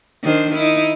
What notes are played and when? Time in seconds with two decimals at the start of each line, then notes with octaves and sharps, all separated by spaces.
0.23 D#3 D4 C5
0.55 D#4 E4